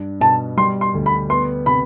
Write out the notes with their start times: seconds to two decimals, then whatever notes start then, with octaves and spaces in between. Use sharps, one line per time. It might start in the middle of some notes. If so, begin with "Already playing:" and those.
Already playing: G2 D4
0.21 B2 A5
0.57 G3 C6
0.81 C6
0.94 D2
1.06 B5
1.30 B3 C6
1.66 C3 B5